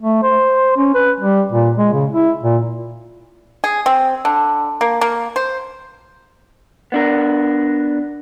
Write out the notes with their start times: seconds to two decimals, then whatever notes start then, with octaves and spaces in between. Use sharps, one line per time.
0.02 A3
0.23 C5
0.77 C#4
0.94 B4
1.20 G3
1.52 A#2
1.78 G#3
1.93 C#3
2.12 E4
2.43 A#2
3.64 G#4
3.86 C4
4.25 D3
4.81 A#3
5.01 A#3
5.36 C5
6.92 B3 D4 A#4